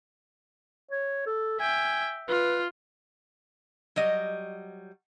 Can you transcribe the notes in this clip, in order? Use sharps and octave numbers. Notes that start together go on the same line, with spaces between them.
C#5
A4
E5 G5 G#5
F4 B4
F#3 G3 D#5